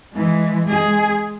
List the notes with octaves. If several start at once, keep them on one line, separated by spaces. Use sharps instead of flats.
E3 G#3
G#3 G#4